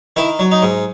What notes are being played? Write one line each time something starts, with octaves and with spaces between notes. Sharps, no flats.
D#3 E4
F#3
D#4
G#2